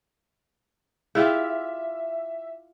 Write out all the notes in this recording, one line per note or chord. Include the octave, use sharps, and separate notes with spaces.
E4 F4 G4 G#4 E5